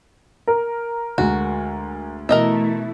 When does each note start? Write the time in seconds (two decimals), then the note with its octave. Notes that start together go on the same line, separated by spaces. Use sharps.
0.47 A#4
1.18 D2 G#3 F#4
2.29 B2 E3 A3 E4 A#4 D#5 E5